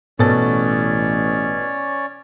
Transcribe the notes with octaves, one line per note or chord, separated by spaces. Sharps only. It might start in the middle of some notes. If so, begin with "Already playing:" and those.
A1 B2 C#4 A4 C#5 D5 A6